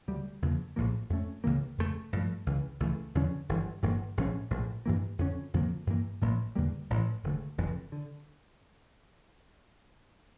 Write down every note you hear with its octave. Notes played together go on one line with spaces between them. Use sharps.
D2 C#3 G3
E2 C#3 F3 A#3
A#1 A2 F3 A#3
F2 D3 A3 C#4
C#2 C#3 E3 A#3
F2 C#3 E3 A3
G2 D3 F3 A3
C#2 C#3 E3
C#2 C#3 E3 A3
E2 D3 F3 C#4
G1 G2 E3
G1 G2 E3 A#3
A#1 A2 F3 C#4
A#1 A2 F3
G2 E3 A#3
F2 D3 G3 C#4
F2 D3 F3 A#3
G2 E3 A#3
A1 A2 F3 A#3
E2 D3 G3 A#3
A1 A2 F3
E1 D2 D3 A3
F1 F2 C#3 E3
D3